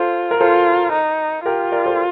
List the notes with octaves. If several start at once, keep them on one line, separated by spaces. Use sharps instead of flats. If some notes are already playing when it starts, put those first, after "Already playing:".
Already playing: F4 A4 C5
A#4
F4 A4 C5
D#4
F4 G4 A#4
A#4 D5
A4 C5